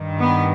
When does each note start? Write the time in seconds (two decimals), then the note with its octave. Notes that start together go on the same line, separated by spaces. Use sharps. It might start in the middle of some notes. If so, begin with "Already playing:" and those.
Already playing: G2 D#3
0.19 B3